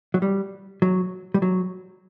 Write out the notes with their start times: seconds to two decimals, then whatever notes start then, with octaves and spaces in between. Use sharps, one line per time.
0.14 F#3
0.22 G3
0.82 F#3
1.34 G3
1.42 F#3